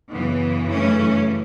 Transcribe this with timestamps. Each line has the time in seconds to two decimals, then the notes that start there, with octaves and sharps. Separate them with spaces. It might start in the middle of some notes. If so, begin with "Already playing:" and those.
0.12 F#2 C#3 E3 B3
0.73 A3 C#4